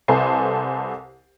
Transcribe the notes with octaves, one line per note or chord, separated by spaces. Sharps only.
C2 A4 B4 C5 G#5 C7